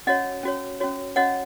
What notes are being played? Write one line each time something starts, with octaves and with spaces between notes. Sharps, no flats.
C#4 F#4 C#5 D#5 F#5
C#4 F#4 C#5
C#4 F#4 C#5
C#4 F#4 C#5 D#5 F#5